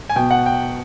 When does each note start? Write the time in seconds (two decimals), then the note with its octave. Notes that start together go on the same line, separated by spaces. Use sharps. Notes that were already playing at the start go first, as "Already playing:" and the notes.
0.09 G#5
0.16 B2 G5
0.31 F#5
0.46 G5